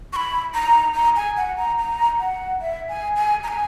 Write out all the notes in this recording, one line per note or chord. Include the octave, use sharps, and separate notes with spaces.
C#6
B5
A#5
A#5
G#5
F#5
A#5
A#5
F#5
E5
G#5
G#5
A#5
G#5